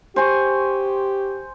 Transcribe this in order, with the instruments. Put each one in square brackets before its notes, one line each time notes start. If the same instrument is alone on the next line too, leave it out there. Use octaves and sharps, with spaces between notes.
[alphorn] G4 [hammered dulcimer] C5 G#5 C#6